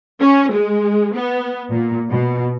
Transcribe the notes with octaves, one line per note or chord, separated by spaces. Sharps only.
C#4
G#3
B3
A#2
B2